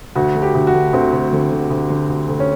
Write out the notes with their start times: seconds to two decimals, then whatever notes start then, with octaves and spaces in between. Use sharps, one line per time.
0.15 D2 F#4
0.35 D3
0.42 G4
0.55 D2
0.67 F#4
0.74 D3
0.93 D2 C4
1.13 D2
1.33 D3
1.52 D3
1.70 D2
1.90 D3
2.09 D2
2.29 D2
2.40 C#4